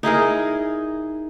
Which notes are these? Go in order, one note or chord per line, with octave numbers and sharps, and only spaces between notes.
D#4 E4 G#4 A#4